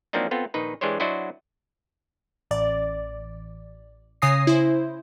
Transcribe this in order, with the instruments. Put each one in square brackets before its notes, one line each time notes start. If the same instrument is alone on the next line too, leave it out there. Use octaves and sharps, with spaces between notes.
[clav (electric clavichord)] F3 F#3 A#3 C4 D4 D#4
B3 C4 F4 A4
A#1 D#3 D#4 B4
E3 G#3 D4 G4 C5 C#5
F#3 D4 E4 F#4 C5 D#5
[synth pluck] A1 D5
C#3 C#5 G#5 D#6 A#6 C7
E4 C5